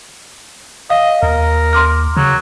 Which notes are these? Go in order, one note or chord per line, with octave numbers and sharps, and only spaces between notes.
D#5 F5
D#2 A#4
C6 D6 F6
C#3 F#3